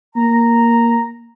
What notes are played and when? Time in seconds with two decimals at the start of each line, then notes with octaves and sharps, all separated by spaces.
0.16 A#3 A#5